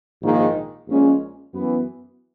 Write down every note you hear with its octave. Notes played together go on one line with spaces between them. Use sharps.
A#1 G#2 D#3 A#3 D#4
A#1 A#2 G#3 C#4
F#2 E3 B3